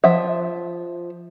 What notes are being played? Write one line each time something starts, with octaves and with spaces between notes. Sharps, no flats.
F3 E5